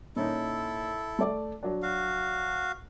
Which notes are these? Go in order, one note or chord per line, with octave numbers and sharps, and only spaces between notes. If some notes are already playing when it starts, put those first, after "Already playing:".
A#2 C#4 D#4 E4 A4
A3 D5
F#3 D4
F#4 F5